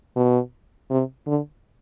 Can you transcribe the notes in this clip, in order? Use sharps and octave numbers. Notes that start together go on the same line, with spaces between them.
B2
C3
D3